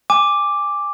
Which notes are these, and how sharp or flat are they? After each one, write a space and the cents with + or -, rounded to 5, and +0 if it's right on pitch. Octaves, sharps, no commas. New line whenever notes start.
G#5 -20 D6 +0